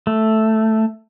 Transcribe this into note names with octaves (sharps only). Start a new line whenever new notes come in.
A3